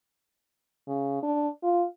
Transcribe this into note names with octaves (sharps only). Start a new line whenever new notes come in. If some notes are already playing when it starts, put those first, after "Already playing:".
C#3
D4
F4